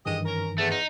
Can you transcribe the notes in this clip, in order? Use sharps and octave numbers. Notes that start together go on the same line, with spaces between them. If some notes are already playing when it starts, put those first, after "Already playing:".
G2 D#3 E3 G#3 G4 D#5
C#4 A#4
E2 A3
D#4